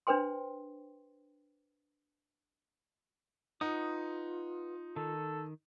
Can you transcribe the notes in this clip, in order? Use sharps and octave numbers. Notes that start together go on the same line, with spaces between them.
D4 B4 C5 G5 C6
D#4 F4 B4 F#5 D#6
D#3 A4